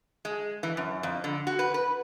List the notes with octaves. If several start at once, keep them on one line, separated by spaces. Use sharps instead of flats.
G#3
E3
F#2
F2
D3
F#4
B4
B4